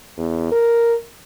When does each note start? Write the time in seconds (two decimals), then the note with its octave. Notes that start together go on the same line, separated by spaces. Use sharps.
0.18 E2
0.52 A#4